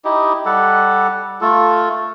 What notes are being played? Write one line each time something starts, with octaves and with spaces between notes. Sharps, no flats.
D#4 E4 G4 D#5
G3 G4 A4 F#5
A3 F4 A4